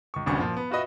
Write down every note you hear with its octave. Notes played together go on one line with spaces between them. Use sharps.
C#2 C#6
F#1 D2 G2 C3 C#4 C#6
A#2 F3
B3
F4 F#4 B4 D#5 E5